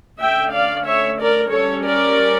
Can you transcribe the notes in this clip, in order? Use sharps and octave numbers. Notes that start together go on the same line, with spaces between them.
D3 A3 C#4 E5 G5
D5 F5
C#5 E5
A#4 D5
G3 C#4 A4 C#5
A#4 D5